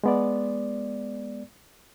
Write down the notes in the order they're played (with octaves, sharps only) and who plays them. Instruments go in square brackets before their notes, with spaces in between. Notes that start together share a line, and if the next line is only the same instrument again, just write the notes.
[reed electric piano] G#3 B3 D5